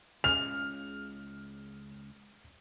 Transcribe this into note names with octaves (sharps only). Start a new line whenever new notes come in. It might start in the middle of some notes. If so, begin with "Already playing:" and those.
C#2 C#3 F6 F7